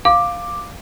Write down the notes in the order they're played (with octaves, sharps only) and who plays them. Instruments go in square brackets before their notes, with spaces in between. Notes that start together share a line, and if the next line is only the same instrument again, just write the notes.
[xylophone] F5 [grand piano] D6